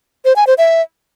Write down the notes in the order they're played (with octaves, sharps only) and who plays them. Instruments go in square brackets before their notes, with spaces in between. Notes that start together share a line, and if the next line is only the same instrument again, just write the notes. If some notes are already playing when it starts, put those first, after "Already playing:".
[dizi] C5
G#5
C5
E5